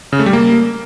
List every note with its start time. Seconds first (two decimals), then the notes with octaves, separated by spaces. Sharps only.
0.13 C#3
0.19 A3
0.26 G3
0.33 A#3